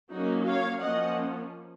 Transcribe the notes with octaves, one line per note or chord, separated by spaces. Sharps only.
F#3 A#3 C#4 D#4 F#4
C#5 F5
F3 A#3 C#4 D#5 F#5